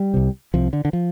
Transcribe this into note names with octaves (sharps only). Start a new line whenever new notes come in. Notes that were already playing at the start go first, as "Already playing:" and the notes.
Already playing: G3
C2 C3
C2 C3 F3
D3
D3
F3